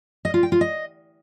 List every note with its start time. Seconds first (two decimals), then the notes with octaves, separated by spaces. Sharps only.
0.25 D#5
0.34 F4
0.43 G5
0.52 F4
0.61 D#5